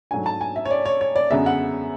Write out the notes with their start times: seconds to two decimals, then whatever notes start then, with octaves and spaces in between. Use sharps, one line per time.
0.11 G#2 F#3 A3 D4 G#5
0.26 A5
0.41 G#5
0.56 E5
0.65 C#5
0.71 D5
0.85 C#5
1.01 C#5
1.16 D5
1.30 F#2 D3 G#3 B3 E5
1.46 F#5